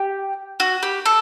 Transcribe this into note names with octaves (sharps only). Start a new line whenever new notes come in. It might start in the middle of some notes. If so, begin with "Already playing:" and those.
Already playing: G4
F#4
G4
A4